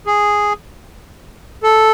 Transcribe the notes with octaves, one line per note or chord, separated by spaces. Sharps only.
G#4
A4